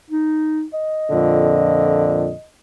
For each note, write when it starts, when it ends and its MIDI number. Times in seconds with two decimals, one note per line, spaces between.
0.11 0.64 63
0.74 2.46 75
1.10 2.32 41
1.10 2.32 46
1.10 2.32 50